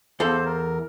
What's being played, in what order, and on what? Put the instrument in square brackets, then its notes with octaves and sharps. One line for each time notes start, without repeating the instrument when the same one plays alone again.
[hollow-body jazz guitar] E2 A4 F5 [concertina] C5
[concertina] A#4